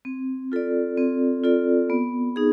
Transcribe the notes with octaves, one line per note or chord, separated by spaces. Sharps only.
C4
F4 A4 D5
C4
F4 A4 D5
B3
D#4 G#4